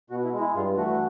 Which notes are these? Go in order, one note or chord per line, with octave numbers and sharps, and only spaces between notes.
B2 F#4
E4
G#3
E4
G2 F4
E3 A3 F#4